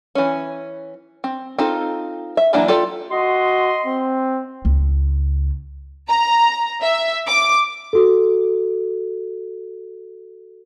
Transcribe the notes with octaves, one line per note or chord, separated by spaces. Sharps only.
E3 C#4
C4
C4 D#4 F4 A4
E5
E3 F#3 A#3 D4 E4
F4 G4 A4 D5
F#4 D#5 C6
C4
C#2
A#5
E5
D6
F#4 A4